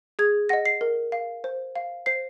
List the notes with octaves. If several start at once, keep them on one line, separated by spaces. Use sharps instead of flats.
G#4 G#6
D#5 F#5 A#6
C7
A#4
F5
C5
F5
C5 C7